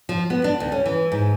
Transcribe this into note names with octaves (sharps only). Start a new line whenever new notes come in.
F3
B3
D4
D2
C#4
E3
G#2